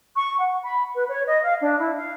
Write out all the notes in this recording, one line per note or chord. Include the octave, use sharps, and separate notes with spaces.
C#6
F#5
B5
B4
C#5
D#5
F5
D4
E4
F5